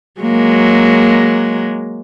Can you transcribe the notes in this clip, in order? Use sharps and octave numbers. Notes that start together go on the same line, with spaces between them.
F#3 G#3 A#3